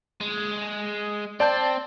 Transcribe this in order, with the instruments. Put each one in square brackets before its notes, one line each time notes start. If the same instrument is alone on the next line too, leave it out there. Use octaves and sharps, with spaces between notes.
[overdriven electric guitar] G#3
[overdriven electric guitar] C4 [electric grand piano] D5 A5 G6